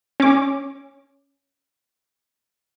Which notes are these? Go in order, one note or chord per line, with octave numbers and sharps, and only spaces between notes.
C#4 D6